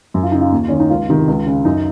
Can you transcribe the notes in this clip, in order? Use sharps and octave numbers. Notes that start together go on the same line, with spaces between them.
F#2
F4
C#3 D#4
F4
D#2
D#3 C#4
D#4
C#2 F4
C3 D#3
C#2
C#3
F#2 D#4